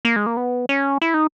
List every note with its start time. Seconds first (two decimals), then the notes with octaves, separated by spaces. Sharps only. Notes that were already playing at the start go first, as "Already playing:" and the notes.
0.05 A#3
0.16 G#3
0.26 A#3
0.37 B3
0.69 C#4
1.02 E4
1.14 D#4